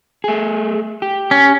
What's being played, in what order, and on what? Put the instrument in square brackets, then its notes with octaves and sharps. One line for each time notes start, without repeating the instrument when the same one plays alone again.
[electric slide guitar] A3 G#4
G4
[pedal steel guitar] C#4